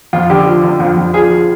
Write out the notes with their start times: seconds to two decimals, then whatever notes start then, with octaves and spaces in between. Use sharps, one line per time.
0.13 F2 F4
0.30 D3 G4
0.46 F3
0.63 D3
0.80 F2
0.97 F2
1.14 F3 G#4
1.30 F3